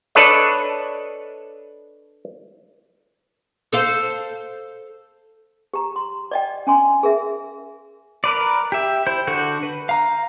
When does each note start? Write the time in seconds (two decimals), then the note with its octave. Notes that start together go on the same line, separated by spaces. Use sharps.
0.15 D4 A4 B4 C#5 D#5
3.72 A4 C5 F5
5.74 G4 A#5
5.96 C6
6.31 D5 D#5 G5
6.67 C#4 G#5 C6
7.03 G#4 A#4 E5
8.24 A#4 B4 D5
8.72 G4 E5
9.07 E4 C5 G6
9.27 D3 F#4 A4 G6
9.63 B4
9.89 F5 A#5